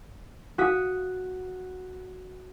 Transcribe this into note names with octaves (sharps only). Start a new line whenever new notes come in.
F#4 D#6 B6